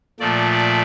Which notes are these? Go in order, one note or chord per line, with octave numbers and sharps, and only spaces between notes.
A#2 F3 A3 D5
D5